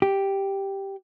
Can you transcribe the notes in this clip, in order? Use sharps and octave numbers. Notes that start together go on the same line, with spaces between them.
G4